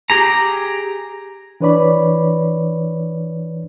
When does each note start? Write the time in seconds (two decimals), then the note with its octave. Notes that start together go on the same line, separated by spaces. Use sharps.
0.10 G4 G#4 A#5
1.60 E3 D4 B4 C#5 D5 B5